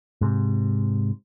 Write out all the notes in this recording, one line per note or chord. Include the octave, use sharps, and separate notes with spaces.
G#2 C3